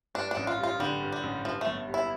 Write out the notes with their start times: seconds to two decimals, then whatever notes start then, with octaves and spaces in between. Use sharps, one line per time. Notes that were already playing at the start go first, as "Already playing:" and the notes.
0.15 G2 D4
0.31 D4
0.37 A1
0.47 F4
0.59 G3 F4
0.79 D3 G3
1.01 G2
1.12 G3
1.23 A1
1.45 G2 F3
1.61 A3
1.66 G1
1.88 G3
1.94 E4